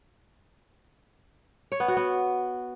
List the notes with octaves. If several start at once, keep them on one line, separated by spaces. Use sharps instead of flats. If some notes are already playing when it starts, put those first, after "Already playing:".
C#5
B3
F#4
B3